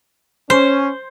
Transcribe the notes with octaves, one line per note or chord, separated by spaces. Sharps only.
C#4 C5